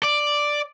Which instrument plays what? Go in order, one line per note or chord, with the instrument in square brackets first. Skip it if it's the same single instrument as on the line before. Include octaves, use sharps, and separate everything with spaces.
[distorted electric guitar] D5